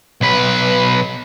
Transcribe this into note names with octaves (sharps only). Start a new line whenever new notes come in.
B1 B4